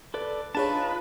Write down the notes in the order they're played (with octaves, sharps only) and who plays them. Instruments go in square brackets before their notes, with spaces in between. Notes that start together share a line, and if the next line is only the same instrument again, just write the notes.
[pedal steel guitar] A4 B4 D5
[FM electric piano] D4 G#4 C#5 [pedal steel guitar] D#4 F4 A5 [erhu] B4